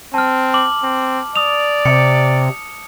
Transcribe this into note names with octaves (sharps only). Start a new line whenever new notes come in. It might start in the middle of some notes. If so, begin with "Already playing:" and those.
C4 A5 F6
D6 F#7
C4
D5 D#6 F7
C3 C#7